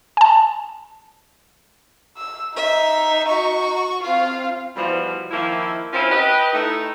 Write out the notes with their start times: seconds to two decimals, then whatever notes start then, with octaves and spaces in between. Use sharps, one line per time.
0.17 G#5 A5
2.17 E6
2.56 D#4 E5
3.28 F#4 C#6
4.02 C4 F4 F5
4.76 B2 E3 F3 G3
5.31 D#3 F3 A#3 E4
5.93 C4 C#4 E4 F4 A#4 C5
6.11 G4 B4 D#5
6.53 A3 D#4 E4